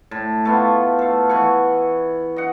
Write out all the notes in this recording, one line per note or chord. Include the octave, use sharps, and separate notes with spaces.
A2
A3 B3 F4
A4 F5
E3 F#5 G#5 C#6
D#5 F#5